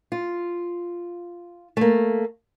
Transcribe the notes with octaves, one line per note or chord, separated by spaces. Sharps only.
F4
A3 A#3